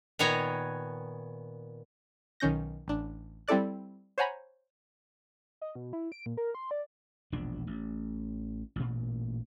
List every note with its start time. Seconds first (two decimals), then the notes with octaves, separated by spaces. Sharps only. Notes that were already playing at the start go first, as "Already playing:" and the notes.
0.19 A#2 D#3 B3 C#5 G#5 A#5
2.40 B1 D#3 C#4 G6 A#6
2.88 A1 D4
3.48 G3 C4 E4 A4 D5 F#6
4.18 C5 C#5 F#5 G#5 A#5 B5
5.62 D#5
5.75 B2
5.93 E4
6.12 D7
6.26 A#2
6.37 A#4
6.55 C6
6.71 D5
7.32 E1 A#1 D4
7.67 A1
8.76 A1 A#2